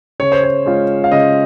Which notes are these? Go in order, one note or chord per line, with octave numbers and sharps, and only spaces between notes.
C#3 C#5
C5
C#5
G#3 C#4 F4
F5
C#3 D#5